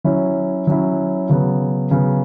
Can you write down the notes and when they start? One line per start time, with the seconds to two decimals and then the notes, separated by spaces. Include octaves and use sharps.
0.04 F#3 C#4 E4
0.67 F#3 C#4 E4
1.29 C#3 F#3 B3
1.91 C#3 F#3 B3